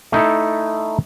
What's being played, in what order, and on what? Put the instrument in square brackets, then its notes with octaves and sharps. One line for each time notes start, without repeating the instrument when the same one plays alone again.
[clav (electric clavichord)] A3 D#4 E4 A4